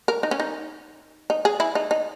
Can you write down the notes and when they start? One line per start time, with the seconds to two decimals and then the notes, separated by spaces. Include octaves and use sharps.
0.08 A#4
0.23 D#4
0.31 C#4
0.40 D#4
1.30 D#4
1.45 G#4
1.60 E4
1.75 D#4
1.91 D#4